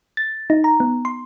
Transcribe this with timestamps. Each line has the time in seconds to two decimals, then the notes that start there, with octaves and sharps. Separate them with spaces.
0.17 A6
0.50 D#4
0.64 A#5
0.80 B3
1.05 C6